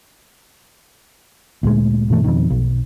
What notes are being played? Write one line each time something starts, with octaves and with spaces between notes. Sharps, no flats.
D2 A#2 G#3
G2 B2 E3 A3
F2 B2 D#3
B1